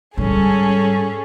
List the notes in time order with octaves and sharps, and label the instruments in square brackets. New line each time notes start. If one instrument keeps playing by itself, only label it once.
[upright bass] G#2 G3 [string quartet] C#4 G#4 A4